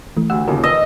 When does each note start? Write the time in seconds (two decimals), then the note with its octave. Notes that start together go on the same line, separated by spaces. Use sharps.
0.17 E3 A3
0.30 D2 G4 F#5 E6
0.48 D#2 A#2 C#3 G4 A#4
0.64 B4 D#5 E6